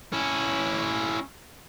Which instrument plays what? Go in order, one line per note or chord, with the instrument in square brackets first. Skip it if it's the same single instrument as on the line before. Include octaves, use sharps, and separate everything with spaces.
[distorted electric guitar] C#4 E4